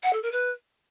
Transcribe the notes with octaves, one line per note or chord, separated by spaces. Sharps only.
F#5
A4
A#4
B4